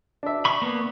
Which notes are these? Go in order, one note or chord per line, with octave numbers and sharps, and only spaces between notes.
D4 E5
B5 C#6
A#3 B3